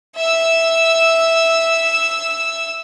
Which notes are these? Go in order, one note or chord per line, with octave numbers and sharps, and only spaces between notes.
E5 E6